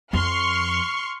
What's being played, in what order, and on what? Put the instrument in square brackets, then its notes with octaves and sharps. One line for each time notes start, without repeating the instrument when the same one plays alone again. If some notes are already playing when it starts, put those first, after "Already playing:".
[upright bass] F2 [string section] C6 C#6 F6